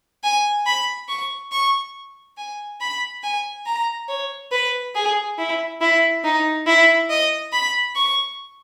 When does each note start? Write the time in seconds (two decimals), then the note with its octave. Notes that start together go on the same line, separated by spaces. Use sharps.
0.23 G#5
0.66 B5
1.09 C#6
1.52 C#6
2.38 G#5
2.81 B5
3.23 G#5
3.66 A#5
4.09 C#5
4.52 B4
4.95 G#4
5.38 E4
5.81 E4
6.24 D#4
6.67 E4
7.10 D#5
7.53 B5
7.96 C#6